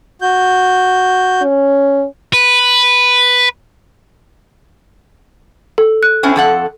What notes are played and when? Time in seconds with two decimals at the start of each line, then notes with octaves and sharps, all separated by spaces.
0.22 F#4 G6
1.42 C#4
2.33 B4
5.78 A4
6.03 F#6
6.23 C4 C#4 E4
6.36 F2 A4 F#5